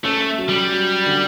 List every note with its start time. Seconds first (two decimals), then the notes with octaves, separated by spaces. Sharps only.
0.04 A3 C#4
0.38 F#3
0.49 G3
0.72 F#3
1.06 D3